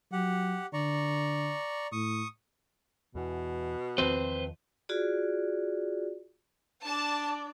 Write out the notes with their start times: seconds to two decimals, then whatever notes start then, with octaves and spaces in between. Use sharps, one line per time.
0.12 F#3 G4 F#5
0.73 D3 D5 A#5 C#6
1.92 A2 C#6 D#6
3.15 E2 B2 E3
3.98 E2 D#3 F3 C4 B4 C5
4.89 F4 F#4 G#4 D5
6.85 D4 D5 A5